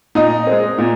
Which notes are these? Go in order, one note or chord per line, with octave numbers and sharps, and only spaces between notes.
A#2 D#4 D#5
G#3 C4
A#2